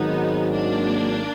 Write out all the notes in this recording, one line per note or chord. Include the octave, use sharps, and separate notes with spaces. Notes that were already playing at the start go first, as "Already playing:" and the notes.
Already playing: G#1 G#2 D#3 F#3 B3 D#4
A#3 D4